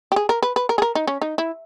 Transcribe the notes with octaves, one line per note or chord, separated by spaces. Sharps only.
G4
G#4
A#4
B4
B4
A#4
G#4
A#4
D#4
C#4
D#4
E4